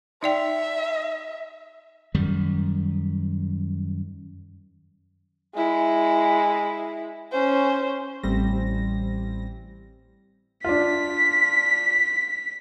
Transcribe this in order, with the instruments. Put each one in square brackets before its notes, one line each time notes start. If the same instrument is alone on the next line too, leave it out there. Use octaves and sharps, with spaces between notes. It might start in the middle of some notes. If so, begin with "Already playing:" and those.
[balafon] D#4 D5 G5 [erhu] E5
[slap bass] F#2 D#3 G3
[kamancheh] G#3 E4
C#4 C5
[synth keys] A1 E3 G3 C4 A#6
[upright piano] D4 F4 [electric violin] B6